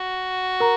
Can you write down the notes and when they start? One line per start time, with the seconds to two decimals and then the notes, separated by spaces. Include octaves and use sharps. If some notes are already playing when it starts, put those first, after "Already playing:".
Already playing: F#4
0.60 A#4 A#5